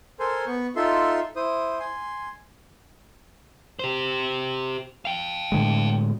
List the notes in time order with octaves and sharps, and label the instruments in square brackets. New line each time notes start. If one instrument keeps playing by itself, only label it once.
[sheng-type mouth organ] A4 A#4 C5 G#5 C6
B3 C#6
D#4 F4 A4 E5 C6
E4 C5 D#6
G#5 C6
[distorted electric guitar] G4 C5
F5 G5
[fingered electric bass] A2 D3 G#3